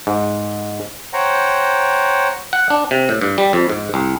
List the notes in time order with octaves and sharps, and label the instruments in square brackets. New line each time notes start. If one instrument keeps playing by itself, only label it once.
[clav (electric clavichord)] G#2
[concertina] C5 C#5 F#5 G5 A#5
[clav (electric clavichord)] F#5
D4
C3
A2
G2
G3
F2
G#2
C2